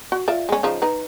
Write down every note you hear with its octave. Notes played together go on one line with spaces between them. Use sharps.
F#4
F4 D5 E5
G#3 C#4
C#3 F3 D#4
D#4 B4